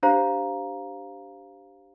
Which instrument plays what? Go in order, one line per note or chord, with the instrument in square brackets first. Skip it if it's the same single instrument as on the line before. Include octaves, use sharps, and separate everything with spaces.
[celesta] D4 G4 C5 F5 A#5